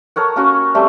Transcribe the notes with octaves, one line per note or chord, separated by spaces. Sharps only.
A4 A#4 C#5 F#5
A#3 C#4 F#4 C#6
G3 A3 C4 A4